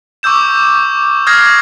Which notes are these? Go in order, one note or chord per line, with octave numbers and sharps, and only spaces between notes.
C#6 D6 E6 G6 E7
D#6 F6 G6 G#6 A#6 C7